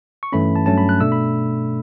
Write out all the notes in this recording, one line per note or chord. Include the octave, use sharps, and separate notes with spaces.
C#6
G2 E3 A3 C#4 B5
A5
G2 F#3 A3 C#4 A5
B5
F#6
B2 A3 D4 E6
B5